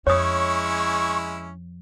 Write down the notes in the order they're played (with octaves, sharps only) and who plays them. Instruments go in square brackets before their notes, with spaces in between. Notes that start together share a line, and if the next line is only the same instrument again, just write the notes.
[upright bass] F2 [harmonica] G#3 C#4 E4 [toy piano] C#5 D#6 [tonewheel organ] C#6